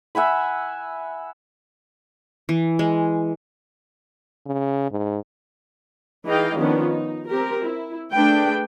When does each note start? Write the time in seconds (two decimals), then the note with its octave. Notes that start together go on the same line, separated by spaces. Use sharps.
0.15 E5 F#5 G#5 B5
2.49 E3
2.79 G#3
4.46 C#3
4.91 G#2
6.26 E3 D#4 G#4 D#5 F5 G5
6.59 D#3 F3 B3 C#4 D4 F4
6.90 D#4
7.28 C4 G4 A#4
7.64 E4
8.14 A3 D4 G#4 B4 G5